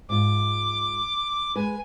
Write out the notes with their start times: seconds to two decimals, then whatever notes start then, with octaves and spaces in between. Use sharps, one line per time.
0.09 G#2 F4 D6
1.56 G#3 B4 G#5